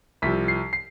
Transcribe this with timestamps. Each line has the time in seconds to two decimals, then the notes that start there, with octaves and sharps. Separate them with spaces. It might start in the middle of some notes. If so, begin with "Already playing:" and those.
0.22 C2 C3 F3 B6
0.48 C7
0.73 C7